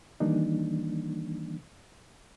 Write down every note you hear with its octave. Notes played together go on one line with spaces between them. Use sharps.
D#3 E3 G3 A#3 D4 D#4